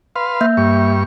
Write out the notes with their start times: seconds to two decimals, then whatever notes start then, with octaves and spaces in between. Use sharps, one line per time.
0.16 B4 F5 C6
0.41 A#3 E5 G6
0.57 G2 C#6